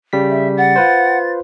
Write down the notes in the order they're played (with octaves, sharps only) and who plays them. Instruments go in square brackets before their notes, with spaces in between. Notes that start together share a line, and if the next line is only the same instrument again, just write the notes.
[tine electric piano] C#3 G3 B6
[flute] E5
[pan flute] F#5 [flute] A6
[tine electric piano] F4 B4 C5